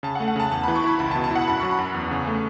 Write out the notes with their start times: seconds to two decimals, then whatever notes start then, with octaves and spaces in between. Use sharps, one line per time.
0.03 C#3 A5
0.15 F#5
0.20 A3
0.28 F#5
0.36 C#3 A5
0.51 E2 A5
0.63 E3 B5
0.75 C#6
0.84 E4 B5
0.99 C#2 B5
1.11 A5
1.15 B2
1.24 A5
1.31 E4 F#5
1.48 F#2 B5
1.60 F#3 C#6
1.71 B5
1.78 F#2
1.94 E2
2.11 C#3
2.27 A3